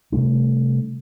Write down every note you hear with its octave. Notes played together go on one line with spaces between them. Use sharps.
C3 G3 A3 D4